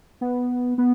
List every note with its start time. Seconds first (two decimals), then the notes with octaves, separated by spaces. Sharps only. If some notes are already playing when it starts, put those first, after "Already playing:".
0.21 B3
0.78 B3